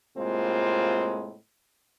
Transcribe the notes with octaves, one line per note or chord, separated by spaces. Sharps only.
A2 C3 G#3 A#3 C4 F4